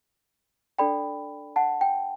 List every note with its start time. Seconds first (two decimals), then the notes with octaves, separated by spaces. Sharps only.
0.79 D4 A4 D5 G5 B5
1.56 F#5 A5
1.81 G5